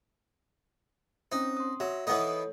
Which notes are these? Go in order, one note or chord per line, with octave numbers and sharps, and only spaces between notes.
C4 C#4 D#4 C5
C6 D#6
F#3 E5
E3 B3 D#4 A4 C#5